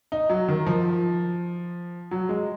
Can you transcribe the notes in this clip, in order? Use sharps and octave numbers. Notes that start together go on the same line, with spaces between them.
D#4
F#3
D#3
F3
F#3
G#3